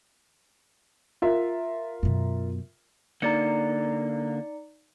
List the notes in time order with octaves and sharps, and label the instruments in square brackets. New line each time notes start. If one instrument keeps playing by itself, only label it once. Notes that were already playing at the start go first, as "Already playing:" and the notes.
[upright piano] F4 A#4 E5
[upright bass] F#2 B2
[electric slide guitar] D3 A#3 [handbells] D#4 D5 C#7